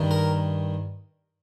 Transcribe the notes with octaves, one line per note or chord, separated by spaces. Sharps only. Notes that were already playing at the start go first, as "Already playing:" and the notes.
Already playing: G2 D#3
A#4